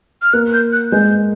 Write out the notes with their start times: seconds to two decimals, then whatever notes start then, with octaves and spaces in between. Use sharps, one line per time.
0.22 F6
0.33 A#3 F#6
0.53 G6
0.73 F#6
0.92 G#3 G6